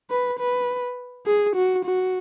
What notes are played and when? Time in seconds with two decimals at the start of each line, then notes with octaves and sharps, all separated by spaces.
0.11 B4
0.39 B4
1.26 G#4
1.56 F#4
1.85 F#4